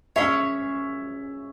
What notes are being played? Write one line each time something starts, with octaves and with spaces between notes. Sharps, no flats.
C#4 G#4 C#5 E5